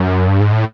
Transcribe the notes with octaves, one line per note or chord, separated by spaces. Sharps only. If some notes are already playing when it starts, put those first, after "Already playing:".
Already playing: F#2
G2
G#2
A2